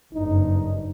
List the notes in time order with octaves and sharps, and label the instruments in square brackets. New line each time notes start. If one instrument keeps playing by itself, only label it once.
[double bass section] F#1 G2 [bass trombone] D#4